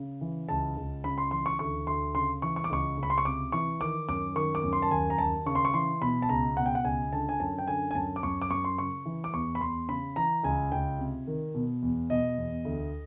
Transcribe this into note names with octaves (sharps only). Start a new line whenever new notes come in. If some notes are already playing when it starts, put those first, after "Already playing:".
Already playing: C#3
E3
C#2 A5
C#2
C#3 B5
C6
E3 C6
C#6
D2 C#6
D2 C6
C#3 C6
E3 C#6
C#6
D6
C#2 C#6
C#2
B5
C6
C#6
C3 D6
E3 C#6
D#3 D6
F#2 D6
D#3 C#6
D6
F#2
C6
A5
D#2 G#5
A#5
D#2 A5
C#3 C#6
C6
C#6
E3 C6
B2 B5
A5
C#2 A#5
B2 F#5
G5
F#5
C#2 G#5
D3 A5
G#5
F#2 A5
G5
D3 G#5
G#5
F#2 A5
D6
F#2 C#6
D6
F#2 C#6
C6
C#3 C#6
E3
D6
E2 C#6
B5
E2 C6
C#3 B5
E3 A#5
C#2 G#5
C#2 G5
C3
D#3
B2
E2
B2 D#5
E2
D2